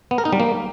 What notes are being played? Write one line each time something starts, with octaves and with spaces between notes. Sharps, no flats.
B3
A#4
D#4
G3
A#3